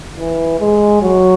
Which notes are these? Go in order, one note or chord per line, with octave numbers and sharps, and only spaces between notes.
E3
G#3
F#3